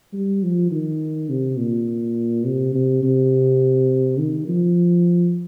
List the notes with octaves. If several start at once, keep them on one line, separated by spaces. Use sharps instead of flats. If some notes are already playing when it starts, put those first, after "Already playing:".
G3
F3
D#3
C3
A#2
C3
C3
C3
D#3
F3